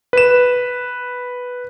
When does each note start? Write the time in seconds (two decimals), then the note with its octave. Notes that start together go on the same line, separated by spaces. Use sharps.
0.13 B4 E7